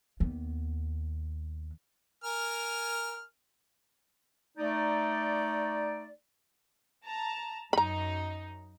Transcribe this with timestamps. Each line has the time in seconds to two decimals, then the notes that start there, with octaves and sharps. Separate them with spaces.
0.20 D#2 B3
2.24 A#4 G#5 F6
4.58 A3 D#4 D5
7.05 A5 A#5
7.73 F#2 D#4 A#5 B5